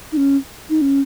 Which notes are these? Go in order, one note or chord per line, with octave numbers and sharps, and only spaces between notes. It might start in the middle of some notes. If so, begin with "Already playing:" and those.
D#4
C#4
D#4
C#4